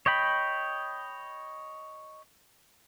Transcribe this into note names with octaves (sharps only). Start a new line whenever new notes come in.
C#5 D#5 G5 B5